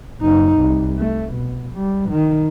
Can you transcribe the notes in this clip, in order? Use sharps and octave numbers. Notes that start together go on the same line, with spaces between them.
F#1 D#4
C2
A3
B2
G3
D#3